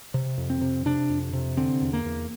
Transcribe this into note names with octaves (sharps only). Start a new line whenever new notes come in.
C3
F2
C4
C3
C3 D4
F2
C3
D3 C4
E2
A#3
E2